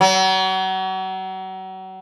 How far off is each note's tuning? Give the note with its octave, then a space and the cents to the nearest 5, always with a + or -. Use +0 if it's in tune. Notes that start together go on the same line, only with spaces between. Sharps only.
F#3 +35